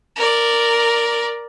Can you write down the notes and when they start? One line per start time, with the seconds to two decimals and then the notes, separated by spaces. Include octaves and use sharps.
0.16 A#4 D5